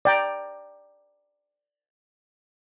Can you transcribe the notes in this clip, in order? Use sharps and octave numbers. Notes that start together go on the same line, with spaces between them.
D5 G5 A#5